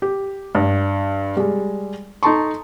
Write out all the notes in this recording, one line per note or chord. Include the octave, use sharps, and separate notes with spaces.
G4
G2
G3 G#3
D#4 A4 A5 C6 C#6